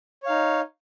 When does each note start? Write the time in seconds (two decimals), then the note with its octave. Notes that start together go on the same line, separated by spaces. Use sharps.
0.23 C#5
0.26 F5
0.29 D#4